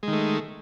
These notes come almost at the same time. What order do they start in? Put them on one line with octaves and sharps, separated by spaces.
G#3 D#3 A3